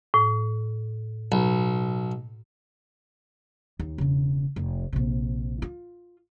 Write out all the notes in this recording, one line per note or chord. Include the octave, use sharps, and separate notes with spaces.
A2
B1
D#2
E1 C#3
F1
A#1 C3
F4